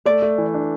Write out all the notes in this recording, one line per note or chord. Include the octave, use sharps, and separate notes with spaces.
A3 D5
A3
E3
D4